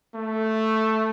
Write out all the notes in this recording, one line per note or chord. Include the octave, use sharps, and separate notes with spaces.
A3